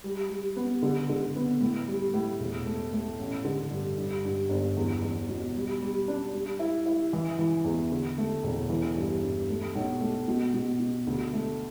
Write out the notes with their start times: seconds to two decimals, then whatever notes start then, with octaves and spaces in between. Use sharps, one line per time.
0.04 G3
0.30 G3
0.56 B3
0.82 D3
1.09 D3
1.36 B3
1.61 A2
1.88 G3
2.14 A2
2.40 E1
2.66 A3
2.93 A3
3.19 A1
3.44 D3
3.71 G2
3.98 G2
4.24 G2
4.49 G1
4.77 E2
5.02 E2
5.29 B2
5.55 G3
5.82 G3
6.08 D4
6.34 G3
6.59 E4
6.86 E4
7.13 E3
7.39 E3
7.65 E2
7.92 D3
8.18 A3
8.43 E1
8.69 E3
8.97 G2
9.23 G2
9.49 A3
9.75 B1
10.01 A3
10.28 B2
10.54 B2
10.80 B2
11.07 D2
11.33 A3